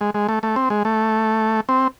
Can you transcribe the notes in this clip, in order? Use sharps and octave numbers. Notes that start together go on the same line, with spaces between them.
G#3
G#3
A3
A3
C4
G#3
A3
C4